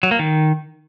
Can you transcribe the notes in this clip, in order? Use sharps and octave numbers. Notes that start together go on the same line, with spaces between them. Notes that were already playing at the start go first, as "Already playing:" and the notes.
F#3
A#3
D#3